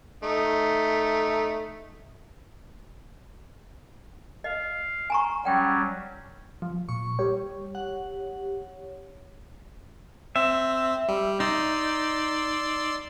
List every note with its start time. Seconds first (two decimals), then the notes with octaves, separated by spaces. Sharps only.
0.23 A3 D#4
4.44 D#5 F5
5.10 G#5 A#5 C#6
5.45 F#3 G3 C#4 F#5 G5
6.62 F3
6.89 A#2 C#6
7.19 G3 G4 C#5
7.75 F#5
10.36 C4 E5
11.08 G3
11.40 D#4 D5 C6 E6